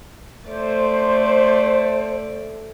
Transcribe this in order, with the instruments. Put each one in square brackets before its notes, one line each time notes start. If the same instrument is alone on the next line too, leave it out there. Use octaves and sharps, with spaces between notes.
[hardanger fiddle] A3 D5 [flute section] C5